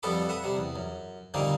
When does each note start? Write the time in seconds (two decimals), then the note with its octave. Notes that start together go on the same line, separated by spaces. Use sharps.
0.03 F2 G3 B3 A4 B5 D6
0.29 B4 E5 F#5
0.44 C3 G3
0.57 E2
0.76 F#2
1.34 A#2 D3 D#3 G3 A#3 C4